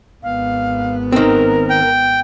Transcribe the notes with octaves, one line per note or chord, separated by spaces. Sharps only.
G#1 B3 F5
D#3 C4 A#4
G5